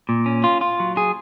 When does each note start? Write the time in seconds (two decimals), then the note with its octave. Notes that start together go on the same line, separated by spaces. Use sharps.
0.09 A#2
0.26 C#4
0.44 F4
0.61 F4
0.80 F#3
0.97 G#4